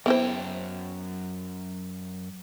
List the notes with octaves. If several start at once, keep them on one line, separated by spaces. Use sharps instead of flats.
F#2 B3 E4 C5 G5